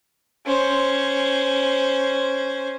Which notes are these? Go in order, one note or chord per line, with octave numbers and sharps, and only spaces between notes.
C#4 C5